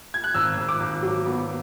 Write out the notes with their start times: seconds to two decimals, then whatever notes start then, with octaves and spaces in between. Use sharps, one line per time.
0.14 G#6
0.24 F#6
0.34 G#1 E6
0.57 G#1
0.69 D6
0.80 G#1
1.03 F#3
1.26 B3